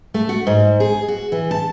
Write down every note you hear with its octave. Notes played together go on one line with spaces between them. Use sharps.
A3
F#4
G#2
G#4
F#4
E3
A5